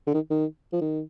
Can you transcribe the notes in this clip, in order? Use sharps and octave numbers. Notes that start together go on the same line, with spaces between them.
D3
D#3
D#3
F3
D#3